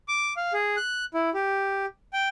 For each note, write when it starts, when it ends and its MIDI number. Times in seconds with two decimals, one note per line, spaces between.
0.08 0.33 86
0.37 0.53 77
0.53 0.76 68
0.77 1.05 90
1.14 1.30 64
1.34 1.85 67
2.13 2.28 79